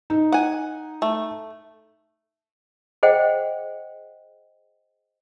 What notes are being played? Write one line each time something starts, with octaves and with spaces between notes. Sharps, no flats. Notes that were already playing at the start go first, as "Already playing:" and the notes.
D#4
F#5 G#5
A3
G#4 C5 D#5 F#5 G5